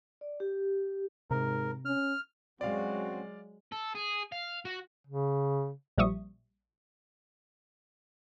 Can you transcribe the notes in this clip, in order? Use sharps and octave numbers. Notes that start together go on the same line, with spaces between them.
D5
G4
G#2 C3 A#4
C#4 F6
F#3 G#3 C4 C#4 F#4 D5 F5
A4
G#4
F5
F#4
C#3
A#1 F3 G3 E5 C#6 D#6